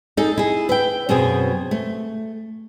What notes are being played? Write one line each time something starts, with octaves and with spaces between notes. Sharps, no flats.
D#4 G#4 A4
E4 G#4
B4 E5 G5
F#2 B2 C4 G#4
A3